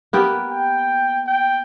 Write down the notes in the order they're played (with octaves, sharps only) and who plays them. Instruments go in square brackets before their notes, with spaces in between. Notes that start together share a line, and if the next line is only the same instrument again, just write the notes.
[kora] A#3 B3 G4
[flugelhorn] G5
G5